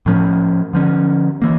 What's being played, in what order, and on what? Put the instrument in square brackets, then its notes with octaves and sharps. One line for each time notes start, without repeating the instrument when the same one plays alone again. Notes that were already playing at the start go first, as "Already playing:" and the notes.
[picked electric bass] A2 F3 C#4
D3 F3 C#4
E3 A#3